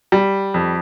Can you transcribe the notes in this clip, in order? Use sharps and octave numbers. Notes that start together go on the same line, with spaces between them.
G3
F2